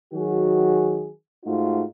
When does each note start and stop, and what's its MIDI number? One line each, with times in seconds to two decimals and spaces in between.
0.14 1.09 51
0.14 1.09 54
0.14 1.09 66
0.14 1.09 68
1.46 1.83 44
1.46 1.83 57
1.46 1.83 63
1.46 1.83 65
1.46 1.83 66